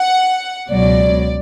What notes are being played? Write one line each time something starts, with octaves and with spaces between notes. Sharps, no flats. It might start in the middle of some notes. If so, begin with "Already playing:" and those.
Already playing: F#5
C#2 B2 F#3 D5